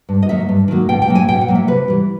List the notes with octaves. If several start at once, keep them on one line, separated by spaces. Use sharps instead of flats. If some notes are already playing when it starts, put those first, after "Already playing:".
G2
D#5
D#3 F#3 A#3 E5
G2
D#3 F#3 A#3
B2 G5
G5
F#3 A#3
G#5
B2 G5
F#5
F#3 A#3
E5
C3 B4
E3 G3